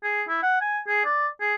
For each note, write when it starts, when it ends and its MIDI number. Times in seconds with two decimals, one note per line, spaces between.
0.04 0.23 68
0.29 0.40 64
0.43 0.60 78
0.61 0.79 80
0.88 1.04 68
1.05 1.28 74
1.41 1.55 68